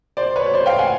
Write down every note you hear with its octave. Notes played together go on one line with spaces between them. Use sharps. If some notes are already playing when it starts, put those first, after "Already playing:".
C5 D5
B4 C#5
C#5
C5 D5
F5 G5
F#5 G#5